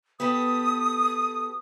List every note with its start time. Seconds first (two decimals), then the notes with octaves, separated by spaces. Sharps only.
0.20 B3 G4 A4 D#6